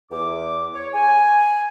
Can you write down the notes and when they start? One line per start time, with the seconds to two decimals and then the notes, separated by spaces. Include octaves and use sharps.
0.11 E2 D6
0.74 C#5
0.94 G#5